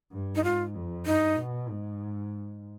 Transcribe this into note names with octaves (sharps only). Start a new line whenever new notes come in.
G2
D#4
G#2 F4
F2
G2 D#4
B2
G#2